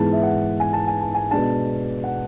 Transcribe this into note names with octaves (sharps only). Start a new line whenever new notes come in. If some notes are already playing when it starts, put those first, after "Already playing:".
Already playing: G#2 E3 G#3 B3 A5
E5
F#5
G#5
A5
G#5
A5
G#5
B2 G#3 D4 A5
F#5